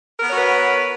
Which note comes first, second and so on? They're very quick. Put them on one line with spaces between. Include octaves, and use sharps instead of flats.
A#4 B3 C#5 F#4 B4